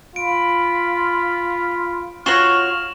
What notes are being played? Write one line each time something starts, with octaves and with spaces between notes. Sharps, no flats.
F4 B5 D7
F4 F#4 C#5 C#6 F6 E7 F#7